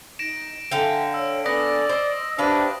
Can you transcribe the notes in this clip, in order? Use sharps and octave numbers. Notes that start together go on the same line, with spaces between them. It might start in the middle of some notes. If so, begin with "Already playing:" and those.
D#4 A#6 D7 E7
D3 E5 F5 G5 G#5
C#5 E6
B3 D4 A4 D5 G#5 D#6 A#6
C5 D#5 E6
D4 G4 B4 C5 E5 F5